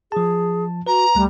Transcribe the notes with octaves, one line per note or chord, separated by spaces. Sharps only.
F3 G#4 A5
F#4 B4 A#5
C#2 G3 A3